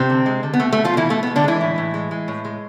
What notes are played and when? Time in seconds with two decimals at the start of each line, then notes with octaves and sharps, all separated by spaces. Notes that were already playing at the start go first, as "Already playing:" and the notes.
Already playing: C3 C4
0.10 D3
0.26 G#3
0.43 D3
0.53 B3
0.60 B2 A3
0.73 A3
0.77 B2
0.85 F3 F4
0.94 B2 E3 E4
1.10 B2 A3
1.23 B3
1.27 G#3
1.36 D3 D4
1.44 E3 G#3 E4
1.61 A2
1.78 A2
1.94 G#3
2.11 G#3
2.28 A2
2.45 G#3